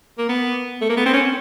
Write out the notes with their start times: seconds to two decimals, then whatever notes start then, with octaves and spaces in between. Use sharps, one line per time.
0.18 A#3
0.29 B3
0.81 A3
0.90 A#3
0.97 B3
1.06 C4
1.14 C#4